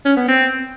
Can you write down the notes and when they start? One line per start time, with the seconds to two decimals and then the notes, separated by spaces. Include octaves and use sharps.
0.05 C#4
0.17 B3
0.28 C4